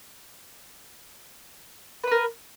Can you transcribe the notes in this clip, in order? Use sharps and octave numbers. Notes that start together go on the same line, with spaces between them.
A#4 B4 B5